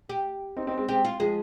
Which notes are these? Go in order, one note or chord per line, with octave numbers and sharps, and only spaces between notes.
G4
C4 D#4
C4 D#4
G#3 C4
G#3 C4 G4
F4
F3 G#3 G#4